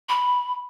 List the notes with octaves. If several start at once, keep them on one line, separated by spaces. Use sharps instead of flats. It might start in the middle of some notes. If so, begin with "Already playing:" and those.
B5